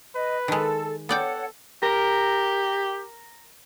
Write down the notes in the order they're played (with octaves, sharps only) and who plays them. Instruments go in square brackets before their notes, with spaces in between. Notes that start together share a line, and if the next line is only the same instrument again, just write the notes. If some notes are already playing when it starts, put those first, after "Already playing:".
[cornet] B4 [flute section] D#5
[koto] D#3 G#3 [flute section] A4
[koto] B3 D5 G5 [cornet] A4 [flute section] C#5 F#5
[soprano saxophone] G4 [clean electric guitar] A#4